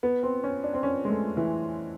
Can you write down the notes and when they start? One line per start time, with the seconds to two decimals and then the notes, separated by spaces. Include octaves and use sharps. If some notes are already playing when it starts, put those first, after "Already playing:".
0.03 B3
0.23 C4
0.44 C#4
0.63 D4
0.74 C4
0.83 C#4
1.05 G#3
1.09 A3
1.37 E3